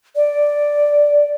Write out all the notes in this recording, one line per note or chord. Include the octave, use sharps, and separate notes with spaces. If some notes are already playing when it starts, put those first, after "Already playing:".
D5